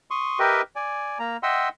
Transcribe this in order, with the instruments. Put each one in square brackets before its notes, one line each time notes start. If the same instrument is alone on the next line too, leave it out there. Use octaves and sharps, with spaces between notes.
[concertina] C6 C#6 D#6
G4 A#4 B4 D#5 E5 G5
D5 G#5
A#3 A#5
D#5 E5 F#5 G5 C6 E6